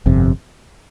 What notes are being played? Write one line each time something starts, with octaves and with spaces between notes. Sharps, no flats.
G1 F2 C3